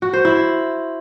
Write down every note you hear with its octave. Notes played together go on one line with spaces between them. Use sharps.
F#4
C5
E4